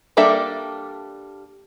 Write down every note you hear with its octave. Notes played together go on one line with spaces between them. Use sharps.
G3 A#3 D4 A4 E5